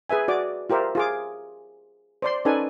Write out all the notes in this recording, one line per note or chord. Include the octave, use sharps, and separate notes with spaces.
G#4 B4 E5 G#5
F#4 D5 D6
F4 G4 A#4 C5 E5
F4 G#4 D6
C5 D5 C6
C#4 D#4 A4 B4 D5 G#5